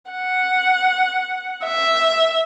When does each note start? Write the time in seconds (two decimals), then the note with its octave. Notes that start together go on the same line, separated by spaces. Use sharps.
0.12 F#5
1.66 E5